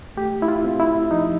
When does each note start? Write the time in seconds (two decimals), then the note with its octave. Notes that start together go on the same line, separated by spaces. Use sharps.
0.17 A3 G4
0.42 E4
0.48 F4
0.65 C4
0.80 E4
1.11 F3 D#4